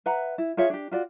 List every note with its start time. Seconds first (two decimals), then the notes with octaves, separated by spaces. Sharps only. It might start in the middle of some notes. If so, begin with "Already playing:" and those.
0.06 B4 E5 F#5 A#5
0.38 E4
0.57 F4 G#4 C#5 E5
0.70 D4 G4
0.91 F4 F#4 D5